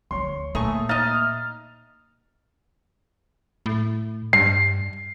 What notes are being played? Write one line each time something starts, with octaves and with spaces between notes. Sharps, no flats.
D2 F3 C#5 C6
A#2 A3 A#3 D#4 G#4 C#6
D#4 D#5 E5 A#5 F6 A6
A2
G2 C7